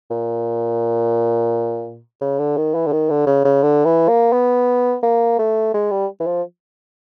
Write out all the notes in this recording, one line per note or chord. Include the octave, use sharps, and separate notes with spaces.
A#2
C#3
D3
D#3
E3
D3
D#3
D3
C#3
C#3
D3
E3
A#3
B3
A#3
A3
G#3
G3
E3
F3